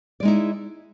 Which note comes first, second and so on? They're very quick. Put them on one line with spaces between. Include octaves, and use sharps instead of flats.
D5 G#3 D#4 E4